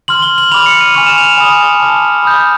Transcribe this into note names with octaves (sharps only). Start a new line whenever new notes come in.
C6 F6 F#7
G7
F#7
B5 D6 F6 F7
C#7
D#7
G#5 C#6 F6 F7
E7
F7
G#5 B5 D#6
A5 D6 F6
B5 D#6 G6